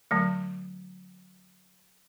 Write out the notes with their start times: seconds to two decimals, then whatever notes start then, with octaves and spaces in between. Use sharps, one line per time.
0.11 D3 F#3 A3